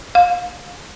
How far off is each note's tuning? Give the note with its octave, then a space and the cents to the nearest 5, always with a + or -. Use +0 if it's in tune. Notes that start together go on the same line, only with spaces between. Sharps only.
F5 +25